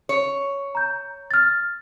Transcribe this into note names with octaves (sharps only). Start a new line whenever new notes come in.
C#5
A#5 G6
F6 A6